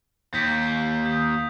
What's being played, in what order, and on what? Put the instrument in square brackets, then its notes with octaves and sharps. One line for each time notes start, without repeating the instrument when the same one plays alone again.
[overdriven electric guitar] D#2 [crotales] G6 B6
[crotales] D#6 G6